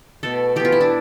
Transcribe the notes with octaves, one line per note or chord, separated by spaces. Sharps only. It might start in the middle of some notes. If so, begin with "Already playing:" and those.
B2 A3 A4
E3 B3 G4
F4
E4
D4